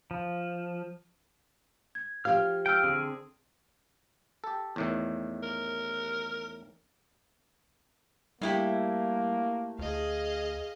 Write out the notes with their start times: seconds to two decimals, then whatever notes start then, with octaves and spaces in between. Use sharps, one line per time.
0.11 F3
1.95 G#6
2.25 F3 G4 F5 F6
2.66 G5 E6 F6 D7
2.83 D3 C4 G#4
4.44 G4 A4
4.76 E2 A2 D#3
5.43 A#4
8.41 A2 G3 A#3 E4 G4
9.79 D2 G#4 D#5 F5